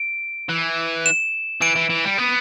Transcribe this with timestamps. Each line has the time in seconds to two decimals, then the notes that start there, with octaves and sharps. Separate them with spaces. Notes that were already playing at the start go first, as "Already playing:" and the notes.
Already playing: D7
0.49 E3
1.06 E7
1.61 E3 D7
1.76 E3
1.90 E3
2.05 G3
2.18 B3